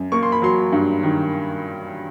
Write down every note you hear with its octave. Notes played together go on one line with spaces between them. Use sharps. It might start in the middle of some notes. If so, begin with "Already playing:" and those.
Already playing: F#2
A#3 C#6
C6
B5
F#3 C6
G2
D#3